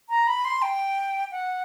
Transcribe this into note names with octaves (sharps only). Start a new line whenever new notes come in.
A#5
B5
C6
G5
F#5